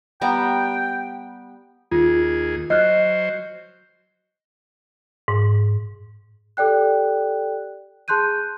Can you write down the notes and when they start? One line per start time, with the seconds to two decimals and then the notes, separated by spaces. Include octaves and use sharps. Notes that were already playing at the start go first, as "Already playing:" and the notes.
0.21 G3 B3 G5 A#5
1.91 D#2 F4 G#4
2.70 F#3 C5 D#5 F6 F#6
5.28 G#2
6.57 G4 A4 D5 G5 F#6
8.08 G#4 A5 C6 F#6 G6 D#7